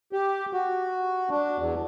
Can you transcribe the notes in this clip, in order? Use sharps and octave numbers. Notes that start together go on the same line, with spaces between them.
G4
F#4
D4
E2